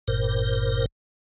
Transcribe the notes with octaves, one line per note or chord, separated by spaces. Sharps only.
G1 G2 A#2 A#4 C5